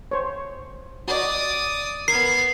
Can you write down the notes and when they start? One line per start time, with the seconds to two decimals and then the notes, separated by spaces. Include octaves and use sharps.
0.11 C5 C#5
1.08 F#4 D5 D#5 D#6
2.08 B3 A#4 G#6 C7